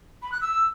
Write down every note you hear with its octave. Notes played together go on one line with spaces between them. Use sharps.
B5
F#6
E6